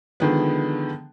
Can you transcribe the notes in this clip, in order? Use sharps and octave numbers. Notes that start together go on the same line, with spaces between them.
D3 D#3 F3 G#3 B3